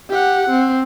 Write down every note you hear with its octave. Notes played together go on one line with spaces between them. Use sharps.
G4 F#5
C4